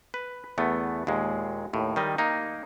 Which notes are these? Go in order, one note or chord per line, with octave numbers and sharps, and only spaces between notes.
B4
E2 A3 B3
D#2 A#2 G#3
D#2 A2
D#3 G3 D#5
A#3 D#4